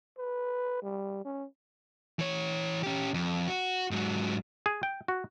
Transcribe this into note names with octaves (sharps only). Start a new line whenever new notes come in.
B4
G3
C#4
E3 C#5
C#4 G4
F2
F#4
G#2 F#3
G#4
G5
F#4